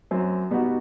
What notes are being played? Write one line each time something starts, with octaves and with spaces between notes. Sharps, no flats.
F#2 F#3 C4
B2 G3 B3 D#4 F#4